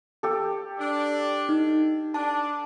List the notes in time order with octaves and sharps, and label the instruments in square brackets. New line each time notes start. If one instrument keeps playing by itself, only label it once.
[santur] G4 A4
[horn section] D4
[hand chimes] D#4
[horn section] D4 [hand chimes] A5